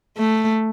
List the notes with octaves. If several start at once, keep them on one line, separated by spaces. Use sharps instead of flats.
A3